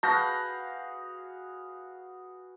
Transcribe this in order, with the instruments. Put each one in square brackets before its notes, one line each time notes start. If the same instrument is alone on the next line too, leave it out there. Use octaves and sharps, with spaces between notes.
[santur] F#4 F5 [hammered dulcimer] G#4 B4 [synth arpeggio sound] A5 [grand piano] G6 A#6